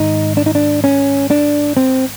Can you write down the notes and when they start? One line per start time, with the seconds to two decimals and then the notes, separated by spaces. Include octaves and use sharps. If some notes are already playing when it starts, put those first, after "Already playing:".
Already playing: G#2 D#3 D#4
0.37 D4
0.46 D#4
0.55 D4
0.84 C#4
1.30 D4
1.77 C4